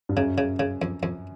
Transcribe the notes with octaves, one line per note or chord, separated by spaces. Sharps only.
G2
F#2 C#3
C#3
C#3
F2
F2